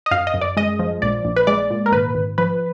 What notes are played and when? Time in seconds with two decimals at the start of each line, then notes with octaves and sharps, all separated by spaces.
0.06 D#5
0.11 F#2 F5
0.27 D#5
0.34 F#2
0.41 D5
0.57 G#3 D#5
0.79 F3
1.02 A#1 D5
1.25 A#1
1.36 B4
1.47 G#3 D5
1.70 A#2
1.86 A#4
1.92 G#1 B4
2.15 G#1
2.38 F3 B4